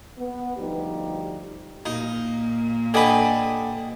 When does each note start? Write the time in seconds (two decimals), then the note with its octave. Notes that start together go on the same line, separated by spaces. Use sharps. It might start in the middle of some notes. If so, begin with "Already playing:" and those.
0.18 B3
0.57 D2 F3 G3 D#4 G4
1.86 A#2 A#3 D#4
2.94 D3 G4 B4 D#5 G#5